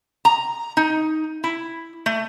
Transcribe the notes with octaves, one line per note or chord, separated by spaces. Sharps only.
A#5
D#4
E4
A3